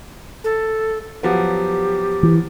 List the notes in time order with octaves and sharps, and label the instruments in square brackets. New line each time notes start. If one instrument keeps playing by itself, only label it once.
[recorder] A4
[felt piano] F3 F#3 B3 [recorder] G4
[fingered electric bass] E3